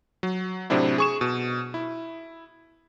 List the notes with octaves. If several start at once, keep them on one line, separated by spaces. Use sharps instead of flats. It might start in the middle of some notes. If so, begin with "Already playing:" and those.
F#3
A2 C3 F#3 C4 D4 E4
G#4 C#6 E7
B2
E4